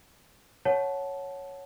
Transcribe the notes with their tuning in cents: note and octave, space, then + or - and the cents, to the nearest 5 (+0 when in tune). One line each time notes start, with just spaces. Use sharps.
C#5 +0 F#5 +0 A5 -15